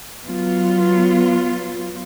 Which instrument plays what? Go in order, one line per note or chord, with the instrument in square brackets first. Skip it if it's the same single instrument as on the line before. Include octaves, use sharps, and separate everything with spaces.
[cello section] F#3 B3 F4